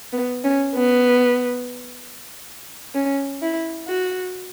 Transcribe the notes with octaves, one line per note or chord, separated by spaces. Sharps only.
B3
C#4
B3
C#4
E4
F#4